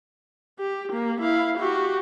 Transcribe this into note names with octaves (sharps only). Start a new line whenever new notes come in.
G4
A#3
E4 F5
F#4 G4